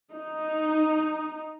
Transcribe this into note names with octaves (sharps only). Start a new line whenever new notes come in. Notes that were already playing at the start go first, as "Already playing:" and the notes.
D#4